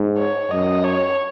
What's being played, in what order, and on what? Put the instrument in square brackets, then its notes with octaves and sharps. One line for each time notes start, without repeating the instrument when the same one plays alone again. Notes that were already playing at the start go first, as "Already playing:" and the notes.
Already playing: [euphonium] G#2
[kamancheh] C#5
[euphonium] F#2 [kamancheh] D#5
[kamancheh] C#5